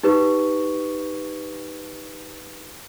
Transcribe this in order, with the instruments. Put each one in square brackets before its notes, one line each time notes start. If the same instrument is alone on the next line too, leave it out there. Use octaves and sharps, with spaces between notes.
[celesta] D#4 G4 B4 C#6